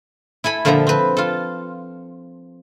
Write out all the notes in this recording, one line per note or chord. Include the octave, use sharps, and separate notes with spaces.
E4 A4 G#5 B5
A#2 D3 F3 A4 E5 A#5
C4 B4
F4 A4